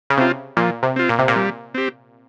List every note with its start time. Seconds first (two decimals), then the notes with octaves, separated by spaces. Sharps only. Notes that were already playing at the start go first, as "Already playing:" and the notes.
0.10 C#3
0.18 C3 C4 F4
0.57 A#2 F3
0.83 C3
0.96 C4 F4
1.09 A#2
1.19 C3
1.28 A#2
1.36 G3
1.74 C4 G4